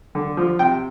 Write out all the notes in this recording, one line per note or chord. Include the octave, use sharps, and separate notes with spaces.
D3
F3
C3 G5